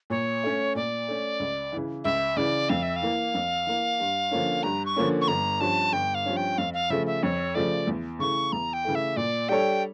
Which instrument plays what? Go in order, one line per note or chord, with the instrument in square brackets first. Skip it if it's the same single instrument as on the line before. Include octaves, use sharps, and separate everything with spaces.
[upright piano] A#2 [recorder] C#5
[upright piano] A3 C#4
[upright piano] A#2 [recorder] D5
[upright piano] A3 C#4
C#2
C#3 E3
[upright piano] C#2 [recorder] E5
[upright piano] C#3 E3 [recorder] D5
[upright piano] F2 [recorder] F5
[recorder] E5
F5
[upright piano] E3 A#3
F2
E3 A#3
G2
D3 F3 A#3 C#4
[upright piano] G2 [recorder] A#5
[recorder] C#6
[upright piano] D3 F3 A#3 C#4
[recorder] C#6
[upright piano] G1 [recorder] A#5
[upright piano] G2 F3 C#4 [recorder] A5
[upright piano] G1 [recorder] G5
[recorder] F5
[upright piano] G2 F3 C#4
[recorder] G5
[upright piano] F2 [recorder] F5
[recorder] F5
[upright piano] C#3 F3 A3 [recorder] E5
[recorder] E5
[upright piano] F2 [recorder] C#5
[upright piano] C#3 F3 A3 [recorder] D5
[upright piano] E2
[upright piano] C#3 E3 A3 [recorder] C#6
[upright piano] E2 [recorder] A#5
[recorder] G5
[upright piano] C#3 E3 A3
[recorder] E5
[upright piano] A#2 [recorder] D5
[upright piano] G3 D4 A4 C#5 [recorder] G5